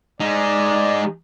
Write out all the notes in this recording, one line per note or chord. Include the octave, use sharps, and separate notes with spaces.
G#3 D#4 D5